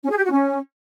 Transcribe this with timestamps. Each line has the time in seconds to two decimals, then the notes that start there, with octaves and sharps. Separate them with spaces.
0.03 C#4
0.10 G#4
0.17 G4
0.24 F#4
0.31 C#4